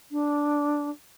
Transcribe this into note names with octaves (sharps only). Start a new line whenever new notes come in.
D4